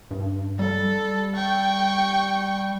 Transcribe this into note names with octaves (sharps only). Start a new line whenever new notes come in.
G2
G3 A4
G5 C#6